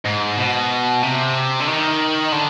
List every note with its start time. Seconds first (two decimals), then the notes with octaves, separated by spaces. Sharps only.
0.06 G#2
0.37 B2
1.03 C3
1.60 D3
1.67 D#3
2.32 D3